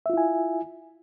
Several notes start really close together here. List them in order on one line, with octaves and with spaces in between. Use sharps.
E5 F4 E4 G#5